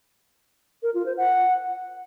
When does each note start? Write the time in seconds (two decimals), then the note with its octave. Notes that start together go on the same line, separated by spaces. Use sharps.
0.83 A#4
0.94 F4
1.06 C5
1.17 F#5